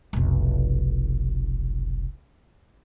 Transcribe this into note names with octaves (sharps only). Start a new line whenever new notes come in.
F1 B1